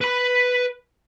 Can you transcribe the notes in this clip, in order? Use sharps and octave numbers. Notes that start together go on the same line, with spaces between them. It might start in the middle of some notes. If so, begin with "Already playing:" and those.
B4 B5